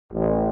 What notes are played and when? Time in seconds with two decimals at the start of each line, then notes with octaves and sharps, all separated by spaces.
0.13 A1